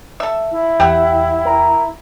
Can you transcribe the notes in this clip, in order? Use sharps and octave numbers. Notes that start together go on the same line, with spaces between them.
A4 E5
E4
E2 G4 E5 F#5 G5
A#4